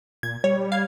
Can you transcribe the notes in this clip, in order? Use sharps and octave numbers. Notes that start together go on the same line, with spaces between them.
A#2 G#6
G3 C#5
F5 G#6